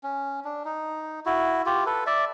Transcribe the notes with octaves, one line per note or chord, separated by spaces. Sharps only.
C#4
D4
D#4
E4 F#4
F4 G4
A4 B4
D5 E5